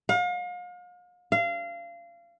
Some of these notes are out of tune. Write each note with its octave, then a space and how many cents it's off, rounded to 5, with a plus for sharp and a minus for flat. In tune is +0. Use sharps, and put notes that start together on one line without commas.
F5 +40
F5 -25